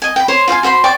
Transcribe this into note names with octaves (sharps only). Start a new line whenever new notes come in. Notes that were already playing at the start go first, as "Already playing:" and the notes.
D#5 G#5
G5 B5
C5 C#5 C6
F4 C5 F5 G#5
F#4 C5 B5 C6
C5 D5 G5 C#6